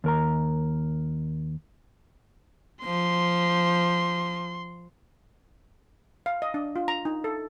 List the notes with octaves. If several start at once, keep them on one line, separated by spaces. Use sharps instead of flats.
D#2 A#4 A#5
F3 C6
F5
D#5
D4
F4
A#5
D#4
A4